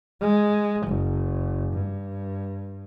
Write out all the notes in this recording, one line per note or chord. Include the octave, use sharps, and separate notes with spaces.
G#3
F#1
G2